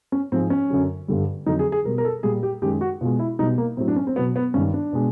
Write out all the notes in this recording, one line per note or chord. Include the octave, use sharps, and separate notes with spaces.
C#4
G#2 F3 G#3 C4
C#4
F#2 D3 F#3
G2 D3 G3
F2 D3 F#3 D#4
G#4
G#4
B2 G3 A#4
A#4
A4
A#2 G3 G#4
G4
F#2 D#3 G#3 G4
F#4
B2 G#3 F4
E4
B2 G3 D#4
A#3
A2 F#3 C4
D4
C#4
C4
B2 F#3 B3
B3
G2 D#3 G3 C#4
D4
B2 G#3